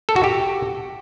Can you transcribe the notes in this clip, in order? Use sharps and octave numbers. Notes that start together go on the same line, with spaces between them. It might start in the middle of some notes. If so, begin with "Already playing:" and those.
A4
F#4
G4